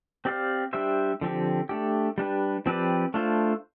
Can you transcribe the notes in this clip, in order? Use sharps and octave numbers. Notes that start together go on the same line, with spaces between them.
C4 G4 D5 F5
G3 D4 G4 C5 E5
D3 F3 C4 G4
A3 D4 G4
G3 D4 G4 B4
F3 C4 G4 B4 D5
A3 D4 F4 C5